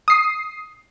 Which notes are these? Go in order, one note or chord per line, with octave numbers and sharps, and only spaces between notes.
D#6 C7